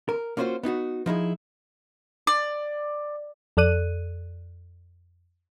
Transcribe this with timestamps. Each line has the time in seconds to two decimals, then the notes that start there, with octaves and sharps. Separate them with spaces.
0.09 A#4
0.37 A#3 C#4 F4 F#4 B4 C5
0.63 B3 D#4 F4 F#4
1.06 F3 D#4 E4 G#4
2.27 D5
3.57 F2 A4 D5 F#6 D#7